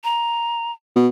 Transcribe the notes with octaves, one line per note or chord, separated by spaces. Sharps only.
A#5
B2